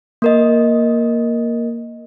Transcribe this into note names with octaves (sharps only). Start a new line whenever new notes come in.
A#3 A#4 D#5